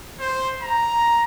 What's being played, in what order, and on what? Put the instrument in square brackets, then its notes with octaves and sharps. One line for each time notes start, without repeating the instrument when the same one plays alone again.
[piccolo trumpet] C5
A#5